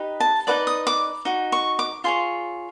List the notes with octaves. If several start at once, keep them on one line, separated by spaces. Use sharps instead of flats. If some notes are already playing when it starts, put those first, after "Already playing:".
Already playing: D#4 G4 B4 D#5
A5
D#4 F#4 B4 D5 D6
D#6
D6
D#4 F#4
C#6
D6
F4 G#4 C#5 C6